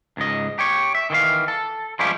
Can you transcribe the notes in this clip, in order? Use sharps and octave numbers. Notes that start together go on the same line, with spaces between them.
C#2 G#2 D#5
G4 C#5
E5
D#3 E3 F5
A4
F3 G3 G#3 C#4 E4 G4